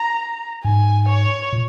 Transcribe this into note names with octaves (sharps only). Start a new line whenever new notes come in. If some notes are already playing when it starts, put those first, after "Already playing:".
Already playing: A#5
G#2 G#5
C#5
A#2